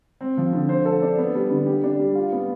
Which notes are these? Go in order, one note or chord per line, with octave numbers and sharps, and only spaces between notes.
C4
F3
D3
C5
A4
D4
B3
G3
D3
G4
D4
G3
F4
B3